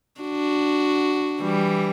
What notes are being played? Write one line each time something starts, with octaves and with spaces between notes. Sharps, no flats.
D4 F#4
E3 G3